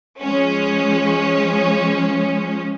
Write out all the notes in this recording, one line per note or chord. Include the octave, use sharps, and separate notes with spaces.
F3 G#3 C#4